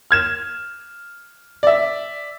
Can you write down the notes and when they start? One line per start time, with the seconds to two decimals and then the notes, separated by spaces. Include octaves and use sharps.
0.11 F6 G#6 E7
1.63 D5 E5